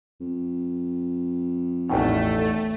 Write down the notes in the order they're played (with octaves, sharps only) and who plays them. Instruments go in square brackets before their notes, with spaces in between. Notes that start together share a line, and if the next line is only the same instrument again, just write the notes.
[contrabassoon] F2
[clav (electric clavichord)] A1 E2 B2 [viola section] A3 [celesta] D#4 G5